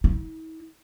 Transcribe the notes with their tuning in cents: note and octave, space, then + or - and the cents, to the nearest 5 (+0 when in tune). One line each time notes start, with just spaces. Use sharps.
E4 -45